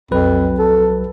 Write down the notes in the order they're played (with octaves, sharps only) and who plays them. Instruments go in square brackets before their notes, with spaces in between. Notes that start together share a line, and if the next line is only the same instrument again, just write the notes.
[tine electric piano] B1 F#3 B4 [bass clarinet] F2
[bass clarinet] A4